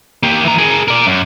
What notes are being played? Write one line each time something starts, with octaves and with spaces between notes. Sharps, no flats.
A#3 G4
E3 A#5
G#4 A#4
A#4 D5
F#2